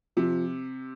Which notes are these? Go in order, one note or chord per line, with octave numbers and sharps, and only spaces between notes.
C3 F3